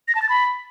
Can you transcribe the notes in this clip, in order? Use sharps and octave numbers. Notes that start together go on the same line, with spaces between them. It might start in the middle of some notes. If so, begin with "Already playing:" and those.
A#6
A5
A6
B5